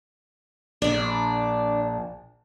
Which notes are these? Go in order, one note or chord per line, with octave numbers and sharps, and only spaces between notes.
A#1 D4 D5